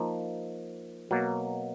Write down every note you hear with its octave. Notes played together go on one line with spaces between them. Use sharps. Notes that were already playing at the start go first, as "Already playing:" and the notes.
Already playing: F3 A#3 D#4
B2 F#3 A#3